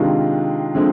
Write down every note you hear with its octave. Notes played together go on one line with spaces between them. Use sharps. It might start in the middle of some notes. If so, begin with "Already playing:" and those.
Already playing: C3 D#3 G#3 D4 F4
D3 F3 G#3 C4